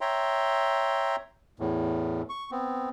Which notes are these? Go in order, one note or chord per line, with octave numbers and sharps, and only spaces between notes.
C#5 E5 G5 A#5 C6
E2 A2
C#6
B3 C4